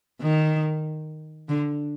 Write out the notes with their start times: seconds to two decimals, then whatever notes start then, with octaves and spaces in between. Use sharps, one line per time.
0.21 D#3
1.49 D3